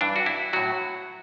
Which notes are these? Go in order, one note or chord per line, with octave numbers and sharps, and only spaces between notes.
G2 E3 D4
F#4
E4
A2 F#3 F#4